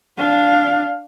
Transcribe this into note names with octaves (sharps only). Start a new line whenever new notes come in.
D4 F5